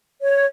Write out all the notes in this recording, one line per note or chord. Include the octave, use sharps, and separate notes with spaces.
C#5